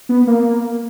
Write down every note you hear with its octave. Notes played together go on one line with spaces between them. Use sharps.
B3
A#3